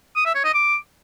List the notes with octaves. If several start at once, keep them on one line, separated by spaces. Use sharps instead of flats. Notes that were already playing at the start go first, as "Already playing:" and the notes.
D#6
E5
C#5
D#5
D6